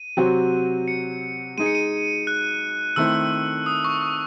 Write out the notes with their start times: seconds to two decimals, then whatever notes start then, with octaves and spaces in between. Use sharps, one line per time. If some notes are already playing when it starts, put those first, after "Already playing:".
Already playing: D#7
0.17 C3 F#3 C4 F#4
0.88 C#7
1.57 G#3 D#4 G#4 D#7
1.66 C#7
1.75 D#7
2.27 F#6
2.96 D#3 A3 C4 E4 E6
3.66 D#6
3.85 C#6
4.02 D#6